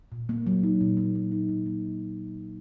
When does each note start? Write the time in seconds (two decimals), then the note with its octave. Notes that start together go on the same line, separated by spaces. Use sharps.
0.12 A#2
0.29 A#3
0.47 F#3
0.63 D#4
0.81 A#2
0.97 A#3
1.15 F#3
1.32 D#4
1.49 A#2
1.66 A#3